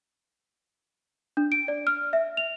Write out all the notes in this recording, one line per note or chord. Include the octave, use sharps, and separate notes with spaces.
D4
D7
D5
F6
E5
F7